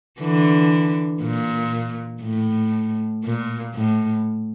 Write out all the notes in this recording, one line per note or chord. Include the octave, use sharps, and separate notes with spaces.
D3 E3
A#2
A2
A#2
A2